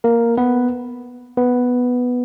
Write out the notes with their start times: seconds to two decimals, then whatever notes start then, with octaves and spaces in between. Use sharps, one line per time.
0.04 A#3 A#4
0.37 B3 B4
1.37 B3 B4